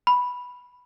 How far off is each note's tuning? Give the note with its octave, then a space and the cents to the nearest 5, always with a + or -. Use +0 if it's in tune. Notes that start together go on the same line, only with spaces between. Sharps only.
B5 -5